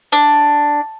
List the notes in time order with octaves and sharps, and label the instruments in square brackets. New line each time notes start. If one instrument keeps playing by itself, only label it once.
[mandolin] D4